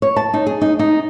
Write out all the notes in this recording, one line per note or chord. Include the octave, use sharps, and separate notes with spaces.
C#5
A5
D#4
G#4
D#4
D#4